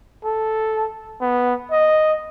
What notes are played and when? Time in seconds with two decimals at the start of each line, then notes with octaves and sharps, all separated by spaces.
0.25 A4
1.21 B3
1.71 D#5